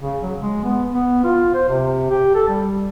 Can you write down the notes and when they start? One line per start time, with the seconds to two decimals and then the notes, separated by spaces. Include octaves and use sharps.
0.02 C#3
0.23 F#3
0.41 G#3
0.64 B3
0.93 B3
1.24 F4
1.54 C5
1.69 C3
2.10 G4
2.35 A4
2.49 G3